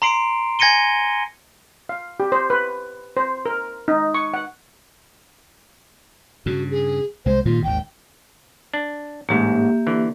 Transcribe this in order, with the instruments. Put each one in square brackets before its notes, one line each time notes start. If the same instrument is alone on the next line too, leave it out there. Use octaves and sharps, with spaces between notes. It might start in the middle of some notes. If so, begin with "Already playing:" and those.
[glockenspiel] A#5 C6 C7 D7
G#5 G#6 A#6 C#7 D#7 G7
[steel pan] F5
G4
C5
B4
C5
A#4
D#4
C#6
F#5
[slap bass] G2 C#3 [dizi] F#4
[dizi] G#4
[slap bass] C2 G#3 [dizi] C5
[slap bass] G2 A#2 D#3 [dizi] F4
[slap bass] G#1 D#2 [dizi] G5
[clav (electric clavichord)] D4
[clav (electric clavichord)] A1 G#2 [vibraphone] A#3 G4 E5
[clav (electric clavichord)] D3 E3